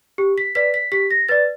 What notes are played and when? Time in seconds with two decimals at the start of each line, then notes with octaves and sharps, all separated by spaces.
0.18 G4
0.38 B6
0.55 B4 D5 B6
0.74 B6
0.92 G4 B6
1.11 A#6
1.29 B4 D5 A6